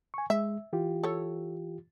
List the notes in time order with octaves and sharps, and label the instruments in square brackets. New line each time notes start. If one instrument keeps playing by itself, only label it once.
[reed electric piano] G#5 C#6
[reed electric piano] G#3 [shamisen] E5
[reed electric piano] E3 F4 G4
[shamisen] A4 C#5